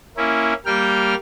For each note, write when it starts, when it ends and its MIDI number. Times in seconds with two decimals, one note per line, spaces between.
0.17 0.54 58
0.17 0.54 61
0.17 0.54 64
0.66 1.15 55
0.66 1.15 58
0.66 1.15 79
0.66 1.15 89